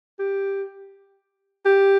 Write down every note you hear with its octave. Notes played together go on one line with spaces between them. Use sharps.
G4
G4